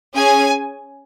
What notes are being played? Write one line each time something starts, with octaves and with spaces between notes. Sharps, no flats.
C#4 G#4 G#5